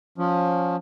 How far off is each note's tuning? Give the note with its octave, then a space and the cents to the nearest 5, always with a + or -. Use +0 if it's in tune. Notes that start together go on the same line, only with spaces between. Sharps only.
F3 +20 C#4 +15